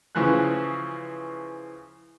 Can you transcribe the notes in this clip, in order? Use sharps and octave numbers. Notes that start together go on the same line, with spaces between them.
C#3 E3 F3 G#4 F#6